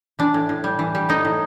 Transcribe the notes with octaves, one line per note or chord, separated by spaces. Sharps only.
E3 D4
A2
A2
G3
E3
G3
A2 D#4
A2